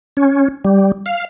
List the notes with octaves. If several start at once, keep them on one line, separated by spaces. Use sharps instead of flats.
C#4
G3
F5